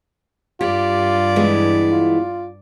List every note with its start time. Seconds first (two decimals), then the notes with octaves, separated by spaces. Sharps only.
0.61 G2 F4 G4 D5
1.36 E3 G#3 B3
1.92 F4